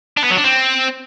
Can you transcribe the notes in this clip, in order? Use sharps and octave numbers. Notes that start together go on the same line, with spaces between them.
D4
B3
F#3
D4
C4